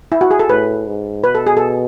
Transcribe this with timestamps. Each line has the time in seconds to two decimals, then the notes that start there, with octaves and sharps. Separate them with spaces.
0.12 E4
0.21 F#4
0.31 G#4
0.39 A4
0.50 A2 B4
0.87 G#2
1.24 B2 B4
1.35 A4
1.47 G#4
1.57 A4